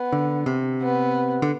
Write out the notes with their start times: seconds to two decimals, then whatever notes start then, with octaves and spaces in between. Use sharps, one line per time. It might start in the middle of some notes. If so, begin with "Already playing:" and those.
Already playing: B3
0.12 D3
0.46 C3
0.82 B3
1.42 D3